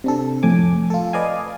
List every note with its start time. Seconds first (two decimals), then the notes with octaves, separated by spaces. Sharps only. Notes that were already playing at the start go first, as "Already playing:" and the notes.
0.04 C3 D4 A4
0.43 F2 A2 G#5 D6
0.90 F4 A4
1.13 B4 D5 D#5 F5 G#5